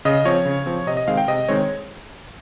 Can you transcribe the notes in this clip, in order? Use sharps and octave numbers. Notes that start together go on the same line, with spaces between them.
C#3 D#5
F3 C4 C#5
C#3
F3 C4
C3 D#5
D#5
D#3 G#3 C4 F5
G5
C3 D#5
D#3 G#3 C4 C#5